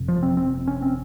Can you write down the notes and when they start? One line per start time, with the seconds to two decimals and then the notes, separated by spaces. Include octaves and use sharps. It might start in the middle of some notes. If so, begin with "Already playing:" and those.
Already playing: G1 F2 C3
0.08 F3
0.23 C4
0.37 C4
0.67 C#4
0.82 C4